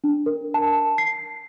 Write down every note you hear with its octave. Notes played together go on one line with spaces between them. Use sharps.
D4
A#4
A5
C7